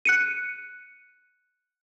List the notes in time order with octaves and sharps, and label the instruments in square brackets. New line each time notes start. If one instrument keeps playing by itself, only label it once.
[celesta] F#6 C#7 D#7